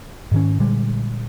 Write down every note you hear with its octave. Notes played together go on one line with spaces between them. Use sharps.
G#2 D#3 C#4
A#2 D3 G3 G#3